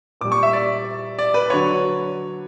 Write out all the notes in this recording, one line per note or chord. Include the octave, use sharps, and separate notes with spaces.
A#2 G3 D6
C#6
E5
D5
D5
B4
D3 F#3 C#5